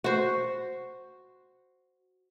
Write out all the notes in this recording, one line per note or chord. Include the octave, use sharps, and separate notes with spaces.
F#4 C5